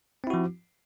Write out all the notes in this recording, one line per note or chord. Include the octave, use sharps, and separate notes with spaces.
F3 C4 E4 F#4